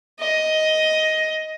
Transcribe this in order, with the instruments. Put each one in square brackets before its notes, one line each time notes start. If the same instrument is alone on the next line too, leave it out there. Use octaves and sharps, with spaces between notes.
[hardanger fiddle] D#5